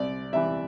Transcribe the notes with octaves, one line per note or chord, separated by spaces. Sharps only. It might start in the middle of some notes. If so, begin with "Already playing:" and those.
Already playing: C2 D5
C3 E3 E5